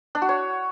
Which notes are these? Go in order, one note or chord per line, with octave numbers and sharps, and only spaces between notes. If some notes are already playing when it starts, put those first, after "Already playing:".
D4
F#4
C#5